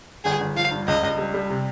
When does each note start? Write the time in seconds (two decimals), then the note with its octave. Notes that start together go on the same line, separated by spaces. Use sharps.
0.24 G1 G#4
0.40 G1
0.56 F3 F5
0.71 G2
0.87 C#2 D#5
1.03 C#2
1.18 G3
1.34 G3
1.50 C3